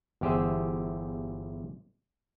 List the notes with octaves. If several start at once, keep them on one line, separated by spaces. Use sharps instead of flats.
G1 E2 G4 G#4 C5 E5